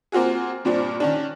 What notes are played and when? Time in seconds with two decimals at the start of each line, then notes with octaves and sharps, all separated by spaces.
0.12 A#3 C4 F4 F#4 G#4
0.65 G2 A#2 C4 D4
1.00 D#3 C#4 D4